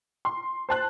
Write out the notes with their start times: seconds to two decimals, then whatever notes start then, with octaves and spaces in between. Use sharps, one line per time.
0.25 C6
0.69 C5 A5 F#6